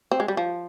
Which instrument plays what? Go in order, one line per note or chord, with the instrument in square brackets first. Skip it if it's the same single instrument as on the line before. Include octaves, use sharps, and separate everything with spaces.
[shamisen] C4
G#3
G3
F3